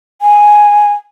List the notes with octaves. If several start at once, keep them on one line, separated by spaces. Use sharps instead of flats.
G#5